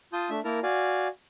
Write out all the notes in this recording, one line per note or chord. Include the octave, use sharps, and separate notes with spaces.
F4 A5 D#6 G6
A3 D4 E5
A#3 E4 A#4 A5 A#5
F#4 D5 F5 G#5